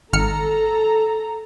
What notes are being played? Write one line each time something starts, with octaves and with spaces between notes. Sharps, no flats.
G#1 A4 A#5 F6 C#7